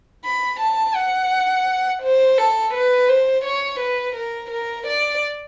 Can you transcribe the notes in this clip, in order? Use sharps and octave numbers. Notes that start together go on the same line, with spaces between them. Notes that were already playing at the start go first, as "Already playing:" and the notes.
B5
A5
F#5
C5
A4
B4
C5
C#5
B4
A#4
A#4
D5